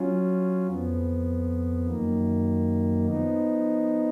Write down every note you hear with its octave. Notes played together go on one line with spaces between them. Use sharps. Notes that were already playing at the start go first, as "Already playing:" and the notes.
Already playing: F#3 C#4 F4
F2 F3 B3
F#2 D#3 A#3
F3 B3 D#4